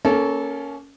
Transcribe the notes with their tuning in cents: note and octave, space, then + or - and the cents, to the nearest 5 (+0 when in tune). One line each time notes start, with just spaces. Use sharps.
A#3 +0 C#4 +5 A4 -20